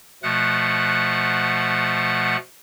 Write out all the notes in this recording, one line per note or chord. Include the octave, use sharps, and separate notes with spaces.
B2 F3 A3 F#5 F#6